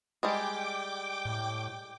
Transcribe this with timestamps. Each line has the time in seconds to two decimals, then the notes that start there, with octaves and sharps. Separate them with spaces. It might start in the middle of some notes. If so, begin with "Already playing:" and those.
0.23 G3 G#3 G#4 G5 D6
1.25 A2